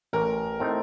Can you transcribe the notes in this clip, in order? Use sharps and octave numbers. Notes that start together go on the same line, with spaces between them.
A1 A#4
A2 A3 C4 D#4